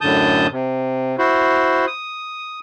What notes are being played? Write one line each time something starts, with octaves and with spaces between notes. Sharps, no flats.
F#2 A2 D3 A5 D#6 G6
C3
E4 F#4 C5
D#6